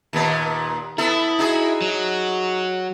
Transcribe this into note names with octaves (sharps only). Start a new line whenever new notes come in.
D#2 A#2 B3
B3 E4 A4
D#4 F#4 G#4
F#3